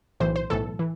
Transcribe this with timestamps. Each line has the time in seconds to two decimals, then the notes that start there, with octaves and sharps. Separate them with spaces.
0.20 B1 A2 E3 C5
0.36 C5
0.50 B1 A2 E3 A4
0.79 E3